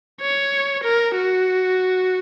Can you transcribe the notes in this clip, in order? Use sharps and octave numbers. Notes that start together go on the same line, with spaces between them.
C#5
A#4
F#4